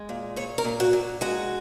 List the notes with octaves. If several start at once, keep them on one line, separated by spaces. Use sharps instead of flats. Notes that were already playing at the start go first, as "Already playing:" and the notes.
Already playing: G#3
A#2
A#2 C#5
A#4
A#2
F#4
A#2
G#3 F#4